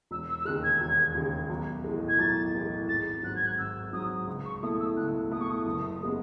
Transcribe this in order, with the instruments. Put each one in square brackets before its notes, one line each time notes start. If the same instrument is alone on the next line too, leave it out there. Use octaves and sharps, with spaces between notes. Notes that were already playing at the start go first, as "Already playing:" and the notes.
[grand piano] E1 [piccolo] E6
[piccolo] E6
E6
[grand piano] D#2 C#3 G#3 [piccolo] F#6
[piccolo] G#6
[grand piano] E1
D#2 C#3 G#3
B1
A2 E3 G#3
[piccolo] G#6
[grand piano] B1 [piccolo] A6
[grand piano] A2 E3 G#3
[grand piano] G#1 [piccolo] A6
[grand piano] G#2 F#3 [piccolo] F#6
[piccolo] G#6
F#6
[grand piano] G#1 [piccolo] E6
[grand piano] G#2 F#3 [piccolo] D#6
[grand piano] C#2
[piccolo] C#6
[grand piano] B2 A3 E4 [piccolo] D#6
[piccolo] E6
[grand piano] C#2 [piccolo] F#6
[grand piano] B2 A3 E4 [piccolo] D#6
[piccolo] C#6
D#6
[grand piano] F#1
C#3 G#3 B3